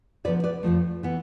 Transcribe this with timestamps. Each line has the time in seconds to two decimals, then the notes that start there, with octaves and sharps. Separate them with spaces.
0.24 D2 C3 F3 B3 B4 D5
0.44 B4 D5
0.63 F2 D3 F3 A3
1.03 E3 B3